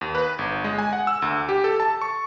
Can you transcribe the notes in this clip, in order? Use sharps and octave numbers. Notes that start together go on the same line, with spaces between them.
D#2
B4
G1
G#3
G#5
F#5
E6
D2
G4
A4
A5
C#6